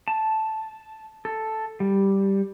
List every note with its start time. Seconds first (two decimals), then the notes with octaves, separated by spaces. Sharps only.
0.08 A5
1.25 A4
1.80 G3